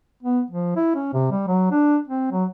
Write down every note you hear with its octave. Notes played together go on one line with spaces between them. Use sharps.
B3
F3
E4
C#4
C3
G3
F#3
D4
C4
F#3